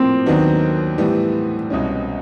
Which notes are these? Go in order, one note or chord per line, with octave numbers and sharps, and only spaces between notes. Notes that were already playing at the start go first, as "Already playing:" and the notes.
Already playing: A2 F3 A#3 C4
D#2 D#3 F#3 B3 D4
A2 E3 G3 B3
C2 B2 G#3 C#4